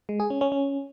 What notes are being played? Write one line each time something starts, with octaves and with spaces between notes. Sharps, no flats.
G#3
G#4
C#4
C#4
C#4